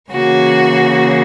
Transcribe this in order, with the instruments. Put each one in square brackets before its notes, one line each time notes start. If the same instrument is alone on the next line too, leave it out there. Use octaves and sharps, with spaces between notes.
[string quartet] C#3 E3 A#3 F#4